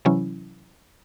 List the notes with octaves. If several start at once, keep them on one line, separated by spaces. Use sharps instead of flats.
C3 E3 F#3 C#4 E4